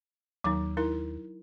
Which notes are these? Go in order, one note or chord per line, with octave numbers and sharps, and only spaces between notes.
D#2 F#3 D#4
D#4 E4 A#4